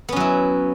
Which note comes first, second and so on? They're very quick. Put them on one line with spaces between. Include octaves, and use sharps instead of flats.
B3 C#4 F#3 E4